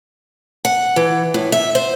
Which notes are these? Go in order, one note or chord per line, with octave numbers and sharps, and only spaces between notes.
F#5
E3
A2
E5
C5